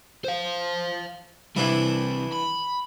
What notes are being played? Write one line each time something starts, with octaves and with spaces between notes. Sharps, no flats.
C5 F5
C3 E3 G3 D4 E4
B5